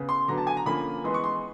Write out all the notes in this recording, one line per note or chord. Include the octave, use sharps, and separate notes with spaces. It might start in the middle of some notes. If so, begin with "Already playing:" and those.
Already playing: C#3 B3
C6
D3 F#3 B3 A#5
A5
G#5
A#5
D3 F3 A#3 C#4 B5
E3 G#3 B3 C6
C#6
C6